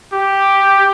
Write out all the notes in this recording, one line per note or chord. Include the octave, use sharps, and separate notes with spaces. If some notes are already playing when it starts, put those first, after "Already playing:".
G4